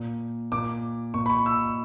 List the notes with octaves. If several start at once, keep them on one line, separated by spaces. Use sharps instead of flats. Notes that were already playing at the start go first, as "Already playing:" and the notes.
Already playing: A#2
A#2 D6
A#2 C#6
B5
C#6
E6